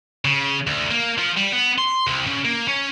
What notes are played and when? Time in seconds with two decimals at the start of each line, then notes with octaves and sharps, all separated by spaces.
0.25 C#3
0.67 D2
0.91 A#3
1.18 F3
1.37 G3
1.53 B3
1.78 C6
2.07 C2
2.27 C#3
2.45 A#3
2.68 C#4